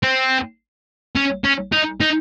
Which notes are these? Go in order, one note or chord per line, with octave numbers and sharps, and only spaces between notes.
C4
C#4
C#4
D#4
D#4